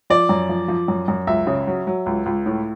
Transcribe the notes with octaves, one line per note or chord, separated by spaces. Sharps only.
F3 D5
F#2
F3
F3
F#2
F#2
C#2 E5
C#3
F#3
F#3
C#2
C#2
A2